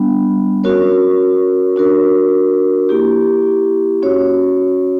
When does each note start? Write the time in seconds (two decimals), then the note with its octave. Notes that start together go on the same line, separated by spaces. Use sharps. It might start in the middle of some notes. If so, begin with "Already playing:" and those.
Already playing: G3 B3 D4
0.64 C#4 F#4 A#4 C#5
1.76 D4 F#4 A#4
2.89 A#3 E4 G4
4.03 C#4 F#4 C#5